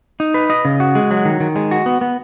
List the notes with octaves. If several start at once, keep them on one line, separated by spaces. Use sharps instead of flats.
D#4
B4
D#5
C#3
F#4
G#3
F#3
D#3
D#3
G#3
F#4
B3
B3